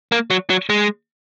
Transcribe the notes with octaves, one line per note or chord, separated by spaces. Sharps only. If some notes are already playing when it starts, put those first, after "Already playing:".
A#3
F#3
F#3
G#3